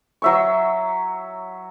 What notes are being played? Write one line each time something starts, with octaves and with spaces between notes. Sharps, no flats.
F#3 E5 C#6